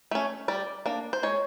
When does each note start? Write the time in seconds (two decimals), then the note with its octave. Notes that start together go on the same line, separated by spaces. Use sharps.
0.11 A3 C#4
0.48 G3 D5
0.86 A#3 D4
1.13 C5
1.23 G#3 C#5